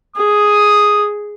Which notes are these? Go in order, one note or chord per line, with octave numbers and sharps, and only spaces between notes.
G#4 D#6